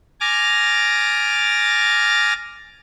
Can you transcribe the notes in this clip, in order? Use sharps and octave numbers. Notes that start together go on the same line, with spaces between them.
G#5 D6 F6 A6 A#6